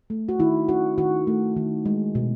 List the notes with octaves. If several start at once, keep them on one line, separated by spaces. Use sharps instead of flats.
A3
F#4
D#3 E4
C#4 F#4
D#3 F#4
A3
D#3
G#3
B2